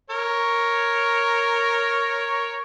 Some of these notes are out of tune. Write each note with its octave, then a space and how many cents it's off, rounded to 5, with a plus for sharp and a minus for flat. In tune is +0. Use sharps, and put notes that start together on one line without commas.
A#4 +0 C#5 +0